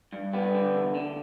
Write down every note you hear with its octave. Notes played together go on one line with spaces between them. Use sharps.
G2
G3 B3
D3
E2
D3